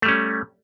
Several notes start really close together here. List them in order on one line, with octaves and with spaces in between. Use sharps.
A3 G3 C#4